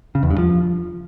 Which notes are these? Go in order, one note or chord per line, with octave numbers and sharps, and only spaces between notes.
C#3
E2
G2
F3